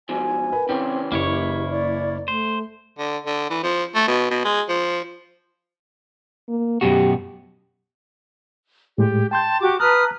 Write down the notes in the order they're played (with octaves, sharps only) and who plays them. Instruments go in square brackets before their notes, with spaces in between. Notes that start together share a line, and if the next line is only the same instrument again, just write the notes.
[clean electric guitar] G#2 B2 F3 [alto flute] G#5
[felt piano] A#4 B4
[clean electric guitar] C#3 E3 C#4 [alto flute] C4 [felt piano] G5
[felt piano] F#1 C#6 [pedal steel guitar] A#3 E4 C#5 [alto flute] G4
[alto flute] D5
[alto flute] A3 [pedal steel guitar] C5
[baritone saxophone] D3
D3
E3
F3
A3
B2
B2
G#3
F3
[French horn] A#3
[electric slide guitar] F#2 B2 F#4 [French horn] G4
[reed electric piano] A2 G#3 [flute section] G4
[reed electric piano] G5 C6 G6 [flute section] A5
[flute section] F#4 G4 D6
[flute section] B4 D#6 F6 [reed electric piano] A5 A#5 F#6